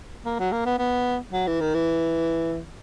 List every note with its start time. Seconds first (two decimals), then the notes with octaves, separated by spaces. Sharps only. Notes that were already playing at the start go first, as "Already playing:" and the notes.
0.25 A#3
0.39 F#3
0.52 A#3
0.65 B3
0.79 B3
1.32 F#3
1.47 E3
1.60 D#3
1.74 E3